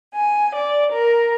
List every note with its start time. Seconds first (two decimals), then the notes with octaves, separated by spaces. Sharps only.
0.14 G#5
0.55 D5
0.91 A#4